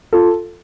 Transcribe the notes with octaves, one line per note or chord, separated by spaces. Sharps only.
F4 A4